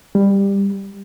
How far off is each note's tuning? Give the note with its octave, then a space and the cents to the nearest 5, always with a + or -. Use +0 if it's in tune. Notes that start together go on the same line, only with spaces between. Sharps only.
G3 +15